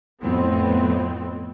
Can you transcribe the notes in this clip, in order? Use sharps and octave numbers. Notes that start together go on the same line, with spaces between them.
F2 A2 B3 C4